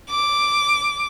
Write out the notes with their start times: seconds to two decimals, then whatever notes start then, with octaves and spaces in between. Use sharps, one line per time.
0.10 D6